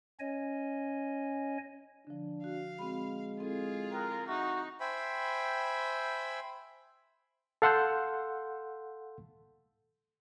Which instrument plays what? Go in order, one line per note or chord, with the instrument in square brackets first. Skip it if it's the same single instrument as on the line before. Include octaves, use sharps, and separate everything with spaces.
[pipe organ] C#4 C#5 D#5 G#5
[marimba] D3 F3 [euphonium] D4
[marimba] F#4 [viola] F5
[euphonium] G#3 [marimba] C4 F#4 B5
[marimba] C4 E4 A4 [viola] F4 G#4
[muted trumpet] A#4 [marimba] G5 D#6 F#6
[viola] D#4 [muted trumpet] F#4 [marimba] E5 C6
[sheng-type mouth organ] C5 E5 G5 G#5 B5
[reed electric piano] A4 F5 F#5 C6 E6 G6